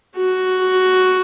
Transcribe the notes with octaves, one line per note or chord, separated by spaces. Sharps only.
F#4